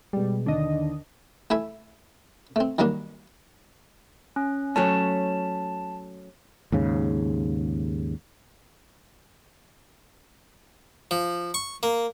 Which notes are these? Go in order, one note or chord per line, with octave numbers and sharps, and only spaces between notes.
B2 G3 G#3
D#2 D3 D4 D#5
A3 E4 E5 G#5
A3 C4
D#3 F#3 G3 A#3 D4
C#4
F#3 A3 C#4 A5
D#2 G#2 C#3
F3
C#6
A#3